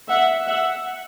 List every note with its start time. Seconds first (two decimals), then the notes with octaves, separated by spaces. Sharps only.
0.10 E5 F#5
0.47 E5 F#5